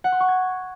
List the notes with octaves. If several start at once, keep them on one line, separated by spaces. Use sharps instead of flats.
F#5
C6
C#6
G#6